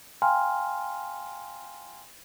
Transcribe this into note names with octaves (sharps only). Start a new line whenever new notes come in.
F5 G5 G#5 A#5 C6 F6